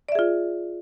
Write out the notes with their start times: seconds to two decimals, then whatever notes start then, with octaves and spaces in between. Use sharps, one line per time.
0.09 D5
0.12 E5
0.15 G#4
0.19 F4